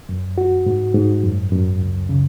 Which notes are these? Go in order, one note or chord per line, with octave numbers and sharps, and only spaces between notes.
F#2
F#4
G#2
G#2
F#2
F#2
C#2
C#3